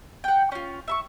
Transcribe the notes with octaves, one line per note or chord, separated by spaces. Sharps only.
F#5 G5
C#4 F4
E5 B5 C#6